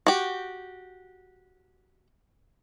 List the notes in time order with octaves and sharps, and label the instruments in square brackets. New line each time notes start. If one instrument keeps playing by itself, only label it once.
[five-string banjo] F#4 G4